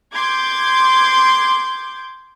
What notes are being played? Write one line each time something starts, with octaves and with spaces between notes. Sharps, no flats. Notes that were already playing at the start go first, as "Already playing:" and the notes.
C6 D6 G6 G#6